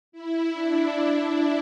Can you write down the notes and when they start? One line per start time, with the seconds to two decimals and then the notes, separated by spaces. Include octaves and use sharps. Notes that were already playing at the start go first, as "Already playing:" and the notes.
0.12 E4
0.53 D4
0.94 E4